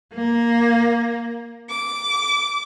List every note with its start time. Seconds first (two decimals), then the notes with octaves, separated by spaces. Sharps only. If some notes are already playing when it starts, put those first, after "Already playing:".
0.14 A#3
1.70 D6